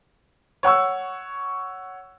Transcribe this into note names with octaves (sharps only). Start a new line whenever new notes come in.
C#5 F#5 C#6 E6